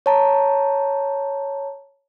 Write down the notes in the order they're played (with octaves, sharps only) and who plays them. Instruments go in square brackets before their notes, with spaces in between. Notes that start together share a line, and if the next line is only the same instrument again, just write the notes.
[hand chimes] C#5 A5 A#5